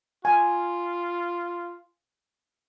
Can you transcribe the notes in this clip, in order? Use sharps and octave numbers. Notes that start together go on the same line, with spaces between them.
F4 G#5